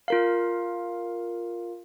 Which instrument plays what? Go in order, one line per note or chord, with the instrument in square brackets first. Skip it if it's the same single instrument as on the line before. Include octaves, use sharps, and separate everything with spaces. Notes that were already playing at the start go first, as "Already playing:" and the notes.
[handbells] F4 A#4 F5